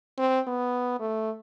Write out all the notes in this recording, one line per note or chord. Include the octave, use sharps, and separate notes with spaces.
C4
B3
A3